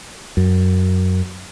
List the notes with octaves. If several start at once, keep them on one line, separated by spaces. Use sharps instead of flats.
F#2